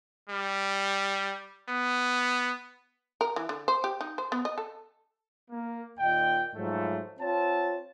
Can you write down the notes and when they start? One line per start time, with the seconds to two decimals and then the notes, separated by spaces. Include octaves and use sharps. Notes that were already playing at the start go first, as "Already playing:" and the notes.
0.29 G3
1.69 B3
3.21 A#4
3.36 E3
3.49 D3
3.68 C5
3.84 G4
4.01 D#4
4.18 C5
4.32 B3
4.45 D#5
4.58 A4
5.50 A#3
5.99 D#2 A#2 D#5 G5
6.55 G#2 F3 F#3 A3
7.19 C4 F4 C#5 A5